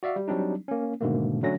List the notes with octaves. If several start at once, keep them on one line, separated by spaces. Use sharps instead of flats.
F#4 D5 E5 F5
G3
F#3 G3 C4 D4 D#4
A#3 C#4
G#2 B2 D3 D#3 A3 A#3
D3 F#3 A3 C#4 A#6